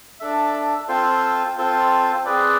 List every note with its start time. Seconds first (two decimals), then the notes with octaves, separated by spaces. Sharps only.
0.20 D4 A4 E5
0.88 C4 F4 A4 C5
1.57 C4 F4 A4 C5
2.25 C4 G#4 B4 D5